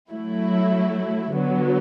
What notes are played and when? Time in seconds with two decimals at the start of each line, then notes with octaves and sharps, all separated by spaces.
0.11 F#3 A3 E4
1.33 D3 F#3 B3